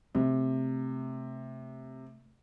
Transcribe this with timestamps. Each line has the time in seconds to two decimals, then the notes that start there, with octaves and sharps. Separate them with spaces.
0.15 C3 A3